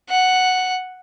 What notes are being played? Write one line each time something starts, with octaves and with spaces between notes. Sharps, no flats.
F#5